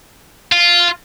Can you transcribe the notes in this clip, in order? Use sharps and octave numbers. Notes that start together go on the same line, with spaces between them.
F4